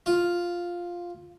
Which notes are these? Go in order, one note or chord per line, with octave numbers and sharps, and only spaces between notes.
F4